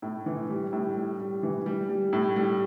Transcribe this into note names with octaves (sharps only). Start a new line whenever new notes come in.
A2
E3
G3
A2
G3
G3
E3
G3
G3
A2
G3